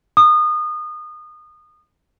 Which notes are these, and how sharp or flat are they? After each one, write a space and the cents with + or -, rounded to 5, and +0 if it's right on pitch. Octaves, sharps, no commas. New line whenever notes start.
D#6 -25